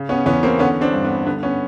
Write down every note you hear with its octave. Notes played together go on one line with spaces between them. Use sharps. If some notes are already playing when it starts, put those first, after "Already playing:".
Already playing: C#3
B3 C#4
E2 B3 C#4
A#3 C4
D3 B3 C#4
C4 D4
G2
B3
D3 B3
B3 C#4